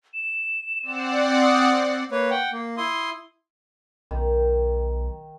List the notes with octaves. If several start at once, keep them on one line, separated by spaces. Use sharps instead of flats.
E7
C4 D5 F#5
D#6
A#3 B4 C#5
F#5 G5
A#3
E4 C6 D#6
B1 D#3